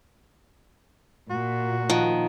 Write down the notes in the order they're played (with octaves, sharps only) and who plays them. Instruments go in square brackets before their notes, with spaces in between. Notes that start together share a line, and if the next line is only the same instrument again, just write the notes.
[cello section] A#2 [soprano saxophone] F#4
[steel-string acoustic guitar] D#3 [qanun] F3 F#5